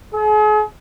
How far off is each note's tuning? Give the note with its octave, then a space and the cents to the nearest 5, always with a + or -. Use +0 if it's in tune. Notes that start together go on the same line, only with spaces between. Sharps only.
G#4 +40